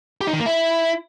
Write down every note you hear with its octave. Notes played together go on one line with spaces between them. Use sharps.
G4
D#4
D#3
A#3
E4